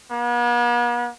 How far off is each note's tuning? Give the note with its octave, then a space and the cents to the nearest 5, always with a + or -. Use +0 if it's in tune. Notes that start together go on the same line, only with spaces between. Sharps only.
B3 -45